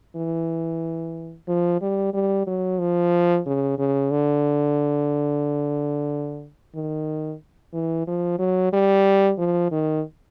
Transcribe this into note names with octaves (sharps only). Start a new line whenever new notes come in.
E3
F3
G3
G3
F#3
F3
C#3
C#3
D3
D#3
E3
F3
F#3
G3
F3
D#3